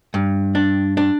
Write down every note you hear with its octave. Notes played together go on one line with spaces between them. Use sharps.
G2
D4
D4